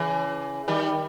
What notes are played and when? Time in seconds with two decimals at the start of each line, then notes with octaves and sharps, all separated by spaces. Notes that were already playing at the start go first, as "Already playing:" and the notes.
Already playing: C#3 E3
0.68 D#3 G3